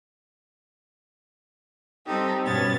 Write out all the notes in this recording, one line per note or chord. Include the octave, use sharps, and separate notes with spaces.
G3 C4 D#4 G4 A4
G2 B2 B3 C#4 G#6 A6